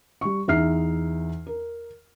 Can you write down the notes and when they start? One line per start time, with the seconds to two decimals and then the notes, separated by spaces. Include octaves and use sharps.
0.21 G3 C#6
0.48 E2 D#4 E5 F6 C7
1.47 A#4